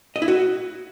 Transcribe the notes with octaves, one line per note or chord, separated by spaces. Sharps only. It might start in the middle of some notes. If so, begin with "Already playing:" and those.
D#5
E4
F#4